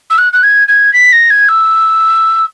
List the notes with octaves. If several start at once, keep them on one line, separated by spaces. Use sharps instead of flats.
E6
F#6
F#6
G#6
G#6
B6
A#6
G#6
E6